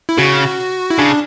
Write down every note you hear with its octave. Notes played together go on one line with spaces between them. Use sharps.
E4
C#3 F#4
E4
C#3 D4